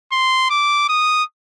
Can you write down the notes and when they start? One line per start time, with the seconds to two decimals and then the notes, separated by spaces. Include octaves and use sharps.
0.12 C6
0.50 D6
0.89 D#6